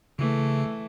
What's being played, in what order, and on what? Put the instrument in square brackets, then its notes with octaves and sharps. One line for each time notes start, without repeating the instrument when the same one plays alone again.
[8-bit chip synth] C#3 [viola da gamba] E3 A3